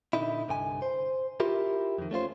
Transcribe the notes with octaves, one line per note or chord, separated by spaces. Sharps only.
A#2 D3 D#4 E4
C2 G2 D3 G5 G#5
C5
E4 F4 G4 A#4
F2 D#3
A3 C#4 F4 C5